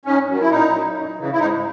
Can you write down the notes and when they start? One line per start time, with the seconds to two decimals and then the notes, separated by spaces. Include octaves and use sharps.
0.05 G#2 C#4
0.28 D#3 F#3
0.41 E4
0.50 A#2 D#4
0.73 F#3
0.95 F#2
1.18 C#3 E3
1.32 E4
1.39 G#2 D#4